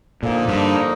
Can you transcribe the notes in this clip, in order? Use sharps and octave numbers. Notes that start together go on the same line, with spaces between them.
A#2 D3 F3 A#3 D#4
G2